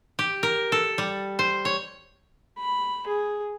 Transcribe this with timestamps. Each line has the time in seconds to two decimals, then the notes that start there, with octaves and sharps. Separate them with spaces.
0.19 G4
0.43 A#4
0.72 A4
0.98 G3
1.39 C5
1.65 C#5
2.58 B5
3.07 G#4